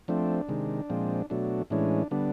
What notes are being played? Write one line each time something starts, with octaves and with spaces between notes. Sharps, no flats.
F3 A3 C4 D4
C3 D#3 G#3
A#2 F3 G#3 C4
B2 F#3 A3 D4
A2 E3 G#3 C#4 D4
D3 G3 B3 D4